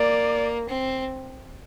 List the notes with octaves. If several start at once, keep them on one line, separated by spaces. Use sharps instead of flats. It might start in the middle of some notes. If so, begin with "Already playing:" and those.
Already playing: A#3 D5
C4